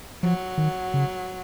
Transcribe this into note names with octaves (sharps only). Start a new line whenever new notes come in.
F3 F#3
D#3
C#3